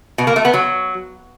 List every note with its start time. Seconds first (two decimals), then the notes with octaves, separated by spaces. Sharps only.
0.18 B2
0.27 A#3
0.36 A3
0.45 B3
0.54 F#3